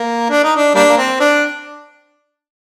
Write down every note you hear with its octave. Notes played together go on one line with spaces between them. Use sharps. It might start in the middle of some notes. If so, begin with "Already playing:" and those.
Already playing: A#3
D4
D#4
D4
G3 A#3 D4
A#3
C4
D4